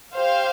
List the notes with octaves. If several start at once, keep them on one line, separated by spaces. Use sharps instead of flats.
G4 C5 F5